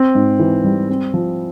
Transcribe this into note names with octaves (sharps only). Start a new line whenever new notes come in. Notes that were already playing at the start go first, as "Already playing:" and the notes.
Already playing: C4
G#2
E3
G3
C4
F3